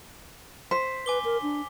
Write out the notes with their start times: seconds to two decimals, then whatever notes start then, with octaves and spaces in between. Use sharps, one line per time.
0.71 C5 B6
1.06 B4 G#5 D6 G7
1.25 A#4
1.43 D4